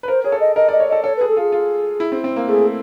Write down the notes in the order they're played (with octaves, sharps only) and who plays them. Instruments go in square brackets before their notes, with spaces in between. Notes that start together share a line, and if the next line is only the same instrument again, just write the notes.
[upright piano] B4
[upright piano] A#4 [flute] C5
[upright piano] G#4 [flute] C#5
[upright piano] A4
[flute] D#5
[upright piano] A#4 [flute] D#5
[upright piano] D5
[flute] D#5
[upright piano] C#5
[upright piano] A4 [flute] D#5
[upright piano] A4 [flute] C#5
[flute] B4
[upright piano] G#4
[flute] A4
[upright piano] F4 [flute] G#4
[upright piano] F4
E4
C4
C4
A#3
[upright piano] A3 [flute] G#4